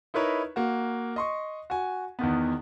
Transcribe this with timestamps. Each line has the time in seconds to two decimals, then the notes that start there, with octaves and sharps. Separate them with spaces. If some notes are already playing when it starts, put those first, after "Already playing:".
0.14 D#4 E4 A#4 B4 C#5
0.56 A#3 F#4
1.16 D#5 C6 C#6
1.70 F#4 G#5
2.19 E2 D#3 B3